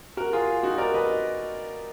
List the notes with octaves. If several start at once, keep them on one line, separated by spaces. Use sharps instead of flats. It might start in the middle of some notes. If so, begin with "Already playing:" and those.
F#4 A#4
F4 G#4
D#4 F#4
A#4 D5
B4 D#5